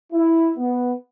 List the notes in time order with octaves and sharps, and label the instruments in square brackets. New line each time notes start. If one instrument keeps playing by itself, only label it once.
[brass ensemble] E4
B3